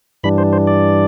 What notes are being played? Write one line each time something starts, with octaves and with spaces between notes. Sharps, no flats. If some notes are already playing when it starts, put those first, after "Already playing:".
G2 E3 G3 D4 B5
C5
C5
D5